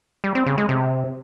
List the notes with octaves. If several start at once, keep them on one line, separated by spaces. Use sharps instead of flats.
G3
C4
C#3
G#3
C3